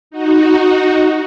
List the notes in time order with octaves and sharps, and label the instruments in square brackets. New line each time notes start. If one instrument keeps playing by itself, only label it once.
[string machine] D#4 F#4